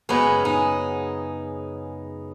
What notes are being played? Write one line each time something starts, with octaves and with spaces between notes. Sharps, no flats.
F#2 C#3 G#3 B3 C#4
D#4